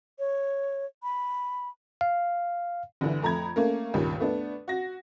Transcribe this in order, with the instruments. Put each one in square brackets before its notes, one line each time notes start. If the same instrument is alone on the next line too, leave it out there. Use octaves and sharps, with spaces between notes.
[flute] C#5
B5
[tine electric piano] F5
[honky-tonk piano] G1 D3 E3
F2 A3 A#5 B5 G#6
A3 A#3 C#4 A#4
C#2 G2 A#2 D#3
A3 B3 D4
F#4 A#6